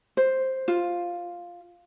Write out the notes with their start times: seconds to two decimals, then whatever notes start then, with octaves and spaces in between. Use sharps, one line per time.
0.17 C5
0.68 F4